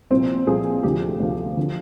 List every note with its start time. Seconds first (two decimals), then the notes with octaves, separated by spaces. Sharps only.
0.10 C2 A#2 F3 C4
0.47 C2 A#2 F3 G#4
0.83 D2 D3 F3 G4
1.20 D2 D3 F3
1.57 D3 F3